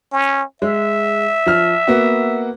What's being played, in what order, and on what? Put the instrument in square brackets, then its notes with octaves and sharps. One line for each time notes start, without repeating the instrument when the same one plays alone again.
[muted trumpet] C#4
[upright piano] G#3 [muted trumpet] E5
[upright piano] F3 F6
A#3 B3 F#4